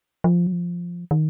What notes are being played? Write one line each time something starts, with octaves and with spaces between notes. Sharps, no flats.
F3
F#3
F3
D#3